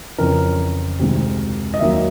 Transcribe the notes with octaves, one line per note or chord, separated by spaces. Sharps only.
F2 C#3 E3 A#4
D2 C3 D#3 G#3
D#5
D#2 D#3 F#3 A#3 E5